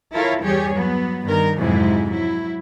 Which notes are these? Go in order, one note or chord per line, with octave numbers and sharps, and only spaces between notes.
E4 F4 A4 A#4 C#5 F5
E2 G2 G3 G4 G#4 C#5
F#3 B3
G2 D#3 A#4
F2 G#2 C3 F#3 G#3 E4
F#3 E4